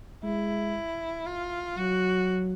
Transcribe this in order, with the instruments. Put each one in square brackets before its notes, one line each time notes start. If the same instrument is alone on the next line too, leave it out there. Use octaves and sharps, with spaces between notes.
[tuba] G#3 [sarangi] E4
[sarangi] F4
[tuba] F#3 [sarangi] F#4